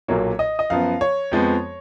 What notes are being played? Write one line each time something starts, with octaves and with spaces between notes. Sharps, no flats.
B1 A#2 F#3 A#3 C#5
D#5
D#5
F#2 F3 B3 F5
C#5
F2 F3 G#3 B3